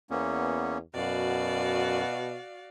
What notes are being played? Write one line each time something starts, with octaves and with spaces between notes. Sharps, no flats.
E2 A#3 B3 C#4
F#2 B2 F#4 D5 F5